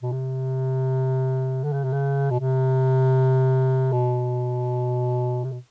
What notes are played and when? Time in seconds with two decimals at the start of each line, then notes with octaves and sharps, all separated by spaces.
0.03 B2
0.12 C3
1.64 D3
1.73 C#3
1.84 C3
1.93 C#3
2.31 B2
2.40 C3
3.92 B2
5.44 C3
5.52 B2